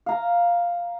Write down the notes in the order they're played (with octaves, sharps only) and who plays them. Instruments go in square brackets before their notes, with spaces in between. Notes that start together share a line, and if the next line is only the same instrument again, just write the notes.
[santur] F5 A#5